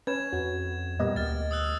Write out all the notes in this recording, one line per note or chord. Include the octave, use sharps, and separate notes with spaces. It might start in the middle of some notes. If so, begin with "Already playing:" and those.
C#4 B4 G#6 E7
F2 F#4
A#2 G3 A#3 B3 D#5
D2 F6 A6
D#6 E6 F#6